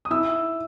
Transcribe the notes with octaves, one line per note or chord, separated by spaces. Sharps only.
D#6
E4 E6